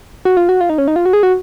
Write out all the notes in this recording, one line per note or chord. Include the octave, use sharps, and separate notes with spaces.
F#4
F4
F#4
F4
D#4
C#4
D#4
F4
F#4
G#4
F#4